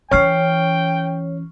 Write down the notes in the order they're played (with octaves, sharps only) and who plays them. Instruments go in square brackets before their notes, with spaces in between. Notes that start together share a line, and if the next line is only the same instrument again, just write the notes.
[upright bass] E3 C#4 [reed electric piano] C#5 [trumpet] G5 [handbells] C#6 F6 C7